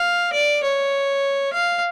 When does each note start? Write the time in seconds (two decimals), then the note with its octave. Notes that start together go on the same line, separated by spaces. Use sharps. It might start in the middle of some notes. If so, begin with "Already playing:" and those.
Already playing: F5
0.33 D5
0.63 C#5
1.53 F5